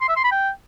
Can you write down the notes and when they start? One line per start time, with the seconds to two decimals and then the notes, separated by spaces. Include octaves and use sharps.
0.01 C6
0.09 E5
0.16 C6
0.24 B5
0.32 G5